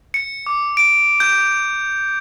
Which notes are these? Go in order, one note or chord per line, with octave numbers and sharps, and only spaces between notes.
C#7
D6
D7
G6